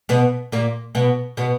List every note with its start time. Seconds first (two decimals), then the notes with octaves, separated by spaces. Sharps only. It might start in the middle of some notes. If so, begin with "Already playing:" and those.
0.09 B2 B3
0.52 A#2 A#3
0.95 B2 B3
1.37 B2 B3